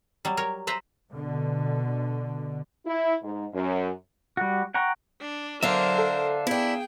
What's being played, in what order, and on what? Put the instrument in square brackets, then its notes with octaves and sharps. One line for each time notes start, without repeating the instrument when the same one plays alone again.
[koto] F#3 G3
A#4 C#5
B4 C5 E5 A#5
[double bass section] B2 D3
[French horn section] E4
G#2
F#2
[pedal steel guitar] G3 F#4
F#5 G5 A#5 C#6
[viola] D4
[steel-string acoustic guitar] D3 D4 [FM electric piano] F#3 [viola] A#4 C5 [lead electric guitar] E5 F5
[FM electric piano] A4
[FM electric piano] B3 [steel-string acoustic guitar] D4 E4 [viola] G#4 G5